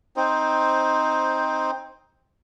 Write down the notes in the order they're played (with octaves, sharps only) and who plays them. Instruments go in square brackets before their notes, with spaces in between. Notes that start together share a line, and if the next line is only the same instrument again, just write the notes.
[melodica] C4 D#4 C5